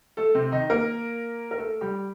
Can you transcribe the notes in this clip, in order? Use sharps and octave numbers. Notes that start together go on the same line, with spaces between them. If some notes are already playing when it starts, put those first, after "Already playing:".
A3 A4
C3 C4
D#3 D#4
A#3 A#4
A#4
A3 A4
G3 G4